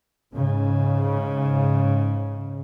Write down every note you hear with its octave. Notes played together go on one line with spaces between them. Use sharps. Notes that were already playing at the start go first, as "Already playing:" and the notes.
G#2 C#3